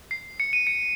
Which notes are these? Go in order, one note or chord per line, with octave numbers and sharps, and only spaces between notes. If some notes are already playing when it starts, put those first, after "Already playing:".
C7
C#7
D#7
C#7